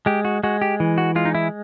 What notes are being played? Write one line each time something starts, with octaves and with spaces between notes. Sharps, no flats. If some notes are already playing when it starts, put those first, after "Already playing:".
G#3 G4
F#4
G#3 F#4
G4
E3
F#4
G#3 F4
D#4
E4